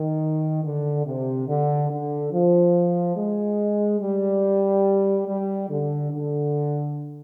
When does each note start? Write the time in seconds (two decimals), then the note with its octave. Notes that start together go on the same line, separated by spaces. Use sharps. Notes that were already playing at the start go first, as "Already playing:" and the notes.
Already playing: D#3
0.63 D3
1.05 C3
1.48 D3
1.90 D3
2.32 F3
3.16 G#3
4.00 G3
5.27 G3
5.69 D3
6.12 D3